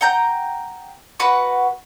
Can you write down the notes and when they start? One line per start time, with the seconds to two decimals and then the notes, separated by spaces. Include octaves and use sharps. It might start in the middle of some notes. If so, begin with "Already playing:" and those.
0.01 F#5 G5 A#5 G6
1.19 F#4 B4 F#5 C#6